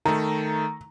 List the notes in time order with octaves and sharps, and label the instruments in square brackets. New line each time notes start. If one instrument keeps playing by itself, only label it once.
[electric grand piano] D#3 A3 [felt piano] A#5